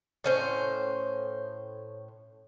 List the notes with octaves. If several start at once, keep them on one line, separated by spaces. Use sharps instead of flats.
A2 C#4 C5